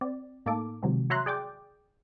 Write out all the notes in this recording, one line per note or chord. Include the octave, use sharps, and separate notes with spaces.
C4 D5
A2 A#3 D#4 A4 D6
C3 D#3 F3 F#3 G#3 C4
F#4 C#5 E5 A#5 C6 F#6
G#4 D5 G5 D6